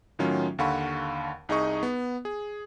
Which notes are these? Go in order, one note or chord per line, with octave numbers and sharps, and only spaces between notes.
A2 D#3 F#3 C#4 F4
D#2 D3 F5 F#5 B5 C#6
C2 D#4 G#4 D#5 C#6 D#6
B3
G#4